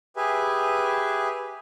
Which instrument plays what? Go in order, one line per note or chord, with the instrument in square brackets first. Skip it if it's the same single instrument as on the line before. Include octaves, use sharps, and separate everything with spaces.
[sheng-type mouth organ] G4 G#4 B4 E5 G#5